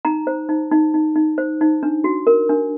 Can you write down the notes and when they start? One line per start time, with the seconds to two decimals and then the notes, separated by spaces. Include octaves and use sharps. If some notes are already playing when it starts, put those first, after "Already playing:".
0.05 D#4 A#5
0.27 C5
0.49 D#4
0.72 D#4
0.94 D#4
1.16 D#4
1.38 C5
1.61 D#4
1.83 D4
2.04 F#4
2.27 A#4
2.49 D4